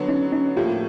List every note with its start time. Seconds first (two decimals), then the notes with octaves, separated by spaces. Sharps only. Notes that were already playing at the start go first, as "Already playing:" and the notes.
Already playing: D3 F#3 B3
0.08 C#4 D#4
0.32 C#4 D#4
0.56 A2 F3 A#3 F4 G4